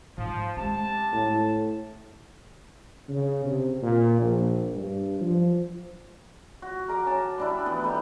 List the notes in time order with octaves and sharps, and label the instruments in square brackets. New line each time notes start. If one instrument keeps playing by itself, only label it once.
[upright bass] G#2 [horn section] F3
[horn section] C3 A5 [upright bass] G#3 C#4
[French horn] A2
[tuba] C#3
C3
A#2
A#1
G2
F3
[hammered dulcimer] F#4
A#4 A#5 D6
C#4 A5
G3 D4 E4
E3 B3
G3 A3 B3 D#4